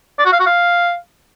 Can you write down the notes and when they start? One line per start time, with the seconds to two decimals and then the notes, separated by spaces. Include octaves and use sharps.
0.19 D5
0.26 F#4
0.33 F5
0.40 F#4
0.47 F5